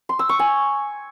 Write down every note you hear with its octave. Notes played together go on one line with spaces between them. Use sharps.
C6
E6
C#6
G#5